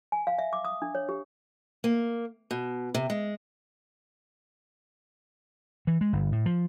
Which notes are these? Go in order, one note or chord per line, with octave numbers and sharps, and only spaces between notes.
G#5
F5
E5
D6
D#6
D4
C#5
G4
A#3
B2
C3
G#3
E3
G#3
G1
A2
F3